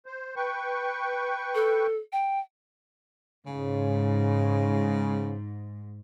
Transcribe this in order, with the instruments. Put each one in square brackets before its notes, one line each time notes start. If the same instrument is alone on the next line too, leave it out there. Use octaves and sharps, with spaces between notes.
[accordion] C5
B4 G5 C#6
[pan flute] A4
G5
[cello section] G#2 [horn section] C#3